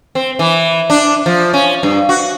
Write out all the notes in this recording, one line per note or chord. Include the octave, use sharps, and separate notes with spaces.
C4
E3
D4
F3
C#4
G2
F#4